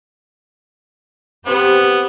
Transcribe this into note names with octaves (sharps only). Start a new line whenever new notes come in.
B3 C4 G4 B4 C5